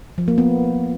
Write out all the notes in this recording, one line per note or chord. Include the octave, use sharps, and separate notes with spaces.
F3
A#3
B3